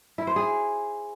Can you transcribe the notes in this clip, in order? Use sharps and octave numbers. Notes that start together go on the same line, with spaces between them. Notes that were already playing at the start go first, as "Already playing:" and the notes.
E4
C5
G#4